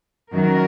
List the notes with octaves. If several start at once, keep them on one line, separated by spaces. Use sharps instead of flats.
F#2 D#3 F#3 F#4 A#4